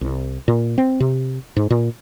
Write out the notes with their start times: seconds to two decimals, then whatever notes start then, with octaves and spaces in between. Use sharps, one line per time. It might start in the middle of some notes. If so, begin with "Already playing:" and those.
0.01 C2
0.48 A#2
0.78 C4
1.00 C3
1.56 G#2
1.70 A#2